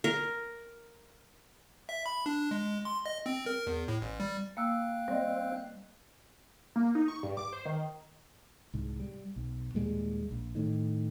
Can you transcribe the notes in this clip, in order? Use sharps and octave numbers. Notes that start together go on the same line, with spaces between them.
A#4
E5
B5
D4
G#3
C6
D#5
C4
A#4
E2
A2
A1
G3
A#3 F5 G5 E6 F#6
G3 C4 D5 D#5
A#3
D#4
C#6
G2
D6
C5
D#3
C2 G#2
G3
B1
D#2 A#2 G3 G#3
A#1
A2 D#3